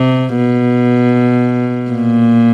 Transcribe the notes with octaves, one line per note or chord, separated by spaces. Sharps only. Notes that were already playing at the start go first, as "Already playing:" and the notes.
Already playing: C3
B2
A#2